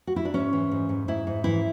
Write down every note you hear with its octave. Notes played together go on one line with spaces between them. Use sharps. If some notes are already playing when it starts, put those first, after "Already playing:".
F#4
E4
D4
G#2 C#4
E3
G#2
G#2
G#2 E4
G#2
E3 E4